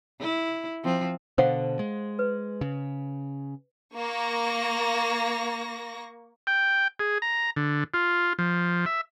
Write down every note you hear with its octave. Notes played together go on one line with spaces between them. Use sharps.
E4
F3 C4
B2 D3 C5 F5 F#5
G#3
B4
C#3
A#3 C#6 A#6
G5
G#4
A#5
D3
F4
F3
E5